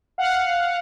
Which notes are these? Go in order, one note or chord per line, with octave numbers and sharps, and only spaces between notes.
F5 F#5